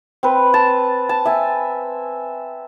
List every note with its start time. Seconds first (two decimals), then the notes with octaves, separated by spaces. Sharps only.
0.23 C4 B4
0.54 A5
1.09 A5
1.25 E5 G#5